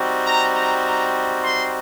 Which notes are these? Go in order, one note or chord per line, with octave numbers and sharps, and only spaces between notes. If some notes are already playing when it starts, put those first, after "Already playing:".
Already playing: G3 C4 D#4 F#4
A#5
A#5
A#5
C6